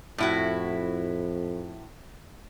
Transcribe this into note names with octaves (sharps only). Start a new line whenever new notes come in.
F2 A2 E4 F#4